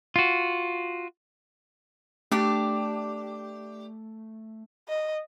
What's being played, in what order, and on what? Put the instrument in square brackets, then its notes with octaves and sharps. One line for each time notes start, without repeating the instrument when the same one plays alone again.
[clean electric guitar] F4 F#4
[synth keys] A3 [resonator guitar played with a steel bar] D4 G4
[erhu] D#5